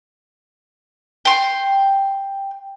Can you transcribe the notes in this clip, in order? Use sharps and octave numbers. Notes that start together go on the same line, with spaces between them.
G5 C6